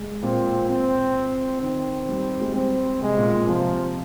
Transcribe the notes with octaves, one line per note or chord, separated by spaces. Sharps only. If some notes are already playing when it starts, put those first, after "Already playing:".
Already playing: G#3
A#2 C4
C4
D#3 C4
G3
G#3
G3 C4
C3 G#3
A#2
A#2
C3 F3